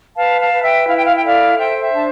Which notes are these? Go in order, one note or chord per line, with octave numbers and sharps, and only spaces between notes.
B4 F5 A5
F5 A5
B4
E5 G5
E4 F5
G5
F5
G5
A4 D5 F5
C5 E5 G5
E5
D4 A5